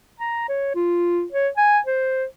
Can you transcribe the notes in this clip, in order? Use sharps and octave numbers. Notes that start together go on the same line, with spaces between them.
A#5
C#5
F4
C#5
G#5
C5